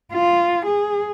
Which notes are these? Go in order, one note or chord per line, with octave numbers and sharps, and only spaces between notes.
F4
G#4